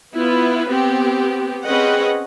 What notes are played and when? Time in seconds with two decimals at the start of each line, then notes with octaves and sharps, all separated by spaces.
0.14 B3 E4 F4 B4
0.67 B3 C4 G4
1.63 C4 C#4 G#4 B4 D#5 F#5